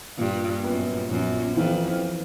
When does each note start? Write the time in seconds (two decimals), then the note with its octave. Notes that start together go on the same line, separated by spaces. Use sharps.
0.18 G2 A#2
0.64 F#2 B3
1.11 A#1 F#2
1.57 F2 E3